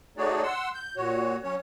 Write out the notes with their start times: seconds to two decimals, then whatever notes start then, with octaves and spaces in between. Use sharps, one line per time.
0.17 A3 D#4 F#4 G#4 C#5 D5
0.43 F#5 C6 E6
0.74 G6
0.97 A#2 F#4 C#5
1.43 F#3 C#4 C#5